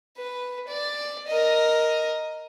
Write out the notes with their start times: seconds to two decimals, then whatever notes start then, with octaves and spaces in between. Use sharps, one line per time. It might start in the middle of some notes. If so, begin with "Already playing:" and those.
0.18 B4
0.68 D5
1.28 A#4 D#5